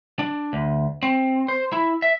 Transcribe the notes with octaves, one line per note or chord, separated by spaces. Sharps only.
D4
D2
C4
C5
E4
E5